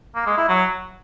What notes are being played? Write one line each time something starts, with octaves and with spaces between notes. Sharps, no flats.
A#3
G#3
E4
F#3